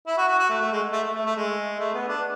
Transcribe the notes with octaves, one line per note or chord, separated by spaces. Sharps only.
E4
F#4
F#4
F#4
A3
A3
G#3
A3
A3
A3
A3
G#3
A3
B3
D4